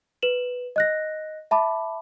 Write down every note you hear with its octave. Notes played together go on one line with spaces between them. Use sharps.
B4 E7 F#7
D#5 F#6 A#6
E5 A5 B5 D6